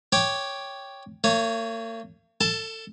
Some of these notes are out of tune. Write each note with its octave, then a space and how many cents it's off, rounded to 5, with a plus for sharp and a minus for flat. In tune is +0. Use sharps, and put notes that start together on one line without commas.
C#5 +0 G5 +0 D6 +5
A#3 -45 C#5 +0
A4 +25 A5 +0